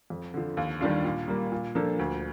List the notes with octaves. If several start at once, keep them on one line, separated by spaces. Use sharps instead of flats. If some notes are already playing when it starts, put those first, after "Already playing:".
F2
D3 F3
D#2
D#3 G3 D4 F4
A#2
G3 A#3
A#2
F3 A#3 D4 A4
D2